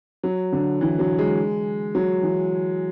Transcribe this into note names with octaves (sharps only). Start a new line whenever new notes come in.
F#3
D3
E3
F#3
G#3
F#3
E3